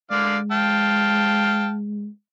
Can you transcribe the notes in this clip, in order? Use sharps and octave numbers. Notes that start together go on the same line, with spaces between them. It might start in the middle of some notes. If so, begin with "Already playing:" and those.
D3 G#3 D5 F5
F5 G5 A5